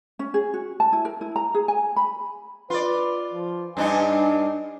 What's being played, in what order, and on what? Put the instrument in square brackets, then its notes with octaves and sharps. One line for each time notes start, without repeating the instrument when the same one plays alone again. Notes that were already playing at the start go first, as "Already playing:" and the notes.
[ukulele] C#4
G#4
F#4
A5
E4
A#4
E4
A#5
G#4
G#5
B5
[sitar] F4 D5 [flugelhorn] B4
[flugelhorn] F3
[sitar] G2 D4 D#4 [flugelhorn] G#5